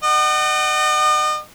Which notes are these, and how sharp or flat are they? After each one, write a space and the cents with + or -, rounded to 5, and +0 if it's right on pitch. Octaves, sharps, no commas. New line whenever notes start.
D#5 -40 F#5 +30